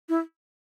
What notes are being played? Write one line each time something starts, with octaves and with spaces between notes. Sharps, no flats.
E4